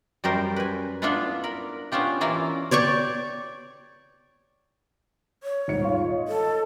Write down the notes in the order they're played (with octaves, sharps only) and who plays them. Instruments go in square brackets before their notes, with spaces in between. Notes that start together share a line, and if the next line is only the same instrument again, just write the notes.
[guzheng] F#2 G3 A#4 C5
B4 G#5
B3 D4 E4 F4 A4 B4
A#4 B5
B3 C#4 D4 F4 G4
E3 A#3 E4 F4 A#4
[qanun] C#5 D5 G5 C#6
[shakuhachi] C#5
[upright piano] D#1 G#2 C#7
F4
D#5
[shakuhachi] A4